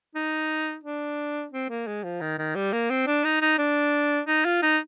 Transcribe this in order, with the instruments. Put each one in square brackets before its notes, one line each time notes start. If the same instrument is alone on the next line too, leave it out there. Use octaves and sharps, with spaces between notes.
[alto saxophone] D#4
D4
C4
A#3
G#3
F3
D#3
D#3
G3
A#3
C4
D4
D#4
D#4
D4
D#4
F4
D#4